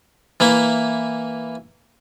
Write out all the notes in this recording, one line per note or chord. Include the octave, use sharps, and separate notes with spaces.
E3 A#3 E4